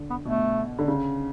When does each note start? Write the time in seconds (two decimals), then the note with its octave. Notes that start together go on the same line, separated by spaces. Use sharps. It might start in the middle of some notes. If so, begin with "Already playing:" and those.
Already playing: D3
0.10 B3
0.25 B2 A3
0.79 D3
0.88 C#3